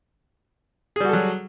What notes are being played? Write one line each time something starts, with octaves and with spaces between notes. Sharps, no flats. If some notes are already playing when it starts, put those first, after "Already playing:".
F#3 G3 F#4 G#4 A4